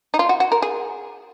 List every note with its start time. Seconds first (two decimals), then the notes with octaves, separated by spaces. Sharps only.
0.14 D#4
0.19 F4
0.29 F#4
0.40 F#4
0.52 A#4
0.62 G#4